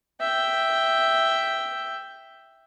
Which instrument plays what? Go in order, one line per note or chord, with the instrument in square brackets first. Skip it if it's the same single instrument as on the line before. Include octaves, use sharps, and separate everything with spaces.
[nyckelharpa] E5 G5